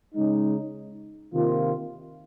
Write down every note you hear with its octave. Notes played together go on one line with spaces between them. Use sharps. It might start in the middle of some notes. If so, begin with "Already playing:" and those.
C#3 G#3 D#4
C3 D#3 A#3 F4